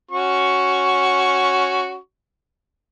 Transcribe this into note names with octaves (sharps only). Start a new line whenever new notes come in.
C#4 F#4 C#6